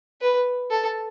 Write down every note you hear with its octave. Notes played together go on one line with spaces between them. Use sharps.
B4
A4